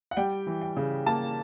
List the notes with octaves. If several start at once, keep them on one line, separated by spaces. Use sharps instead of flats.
F#5
G3 G5
E3
G5
C#3
A#3 A5